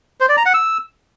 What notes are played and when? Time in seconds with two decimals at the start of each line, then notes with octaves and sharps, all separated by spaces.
0.20 C5
0.29 D5
0.37 A#5
0.46 F#5
0.54 E6